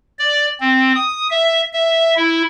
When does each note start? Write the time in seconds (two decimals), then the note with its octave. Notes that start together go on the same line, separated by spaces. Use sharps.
0.19 D5
0.60 C4
0.95 D#6
1.30 E5
1.73 E5
2.16 E4